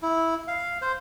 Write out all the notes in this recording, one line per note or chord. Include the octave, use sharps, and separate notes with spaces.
E4
F5
C5